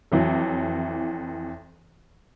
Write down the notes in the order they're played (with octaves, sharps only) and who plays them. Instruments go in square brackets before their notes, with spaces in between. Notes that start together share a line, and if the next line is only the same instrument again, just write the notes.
[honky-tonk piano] F2 E3 F#3